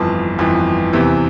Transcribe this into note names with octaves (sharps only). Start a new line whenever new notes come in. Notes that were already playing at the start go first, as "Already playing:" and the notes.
Already playing: G1 F2 E3 A5
G1 F2 E3
E2 C3 E3